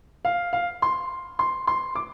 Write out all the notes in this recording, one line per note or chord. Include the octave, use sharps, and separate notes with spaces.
F5
F5
C6
C6
C6
D6